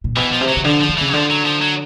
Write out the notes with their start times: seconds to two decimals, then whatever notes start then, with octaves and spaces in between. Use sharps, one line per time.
0.04 A#2
0.17 B2 E3
0.32 F3
0.41 C3
0.48 F#3
0.57 C#3
0.65 D3 F3
0.81 F3
0.89 D3
0.98 C#3 E3
1.08 F#3
1.13 D3 F3
1.30 F#3
1.45 F3
1.62 F#3